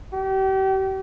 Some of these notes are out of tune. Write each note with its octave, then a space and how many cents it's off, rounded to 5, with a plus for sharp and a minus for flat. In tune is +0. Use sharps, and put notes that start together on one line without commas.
G4 -35